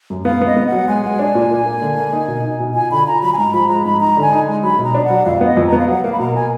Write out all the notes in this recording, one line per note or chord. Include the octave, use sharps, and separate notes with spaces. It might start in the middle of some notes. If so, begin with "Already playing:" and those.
F#2
B3 F5
B3
D#5
B3
F#5
F#3
G#3 G#5
G#3
D4
A#2
A#3
A#3
D3
A#3
D#4
B2
D#4
B2
F4 G#5
D3 B5
F4 A#5
F#3 B5
G#5
G#2 A#5
F3 B5
G#3 A#5
G#2 B5
D#4 A#5
D3 G#5
D#4
G#3
F#3 B5
B2
A#5
D4
F#5
F#3
F2 F5
B3
D#5
F2
A#5
B3
F5
F#3 F#5
A#3 F5
B5
B2 A#5
A#3 G#5